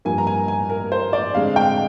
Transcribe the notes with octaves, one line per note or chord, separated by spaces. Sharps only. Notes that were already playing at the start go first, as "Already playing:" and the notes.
G2 F3 A#3 G#5
A#5
G#5
G#5
A#4
C5
D5
F2 D3 G#3 F5
G5